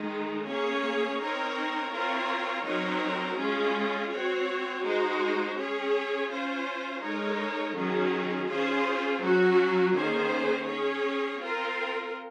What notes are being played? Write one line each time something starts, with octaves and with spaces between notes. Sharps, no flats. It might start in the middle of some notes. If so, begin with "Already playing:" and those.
Already playing: D#3 G#3 D#4
A#3 C#4 G#4 C#5
C4 D#4 A#4 C#5
C4 F4 A#4 C#5
F#3 C4 D#4 A#4 C#5
G#3 C#4 F4 G#4
C4 F#4 C#5
G#3 D#4 F#4 C5
C#4 G#4 C#5
C#4 F4 C5
G#3 D#4 A#4 C#5
D#3 F#3 C#4 G#4
C#4 F4 G#4 C5
F#3 C#4 F#4
D#3 A#3 C#4 G#4 C5
C#4 G#4 C#5
C4 F4 A#4